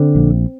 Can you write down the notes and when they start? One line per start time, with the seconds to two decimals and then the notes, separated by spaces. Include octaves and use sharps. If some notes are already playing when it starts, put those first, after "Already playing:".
Already playing: D3 C4
0.15 A#1